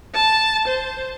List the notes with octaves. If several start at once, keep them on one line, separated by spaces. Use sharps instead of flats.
A5
C5